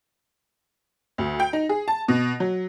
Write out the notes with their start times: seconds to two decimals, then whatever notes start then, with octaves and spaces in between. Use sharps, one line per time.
1.18 D2
1.40 G5
1.53 D#4
1.69 G#4
1.88 A5
2.08 B2
2.40 F#3